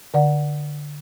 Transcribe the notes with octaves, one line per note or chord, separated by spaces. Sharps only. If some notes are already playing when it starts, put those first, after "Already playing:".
D3 D5 F#5